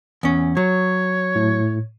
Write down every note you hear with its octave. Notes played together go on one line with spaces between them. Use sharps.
E2 C#4
F#3 C#5
A2